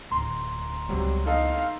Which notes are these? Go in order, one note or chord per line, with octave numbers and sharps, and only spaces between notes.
D1 D2 A#5 C6
C#2 C3 F#3 G3 B3
D#4 A4 D#5 F5